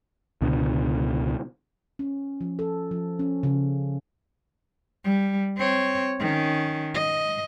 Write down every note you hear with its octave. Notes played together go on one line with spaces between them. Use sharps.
C#2 B2 D3
C#4
F3
A4
F3
C#4
C#3
G3
C4 C#5
D#3 C#4
D#5